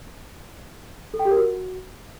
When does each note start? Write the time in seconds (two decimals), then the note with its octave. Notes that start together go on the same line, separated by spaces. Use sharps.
1.14 A4
1.19 G5
1.25 G4
1.31 A#4
1.37 F#4